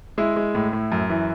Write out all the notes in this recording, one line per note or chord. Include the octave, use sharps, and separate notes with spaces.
G#3 E4
G#3
A2
A2
F#2
E3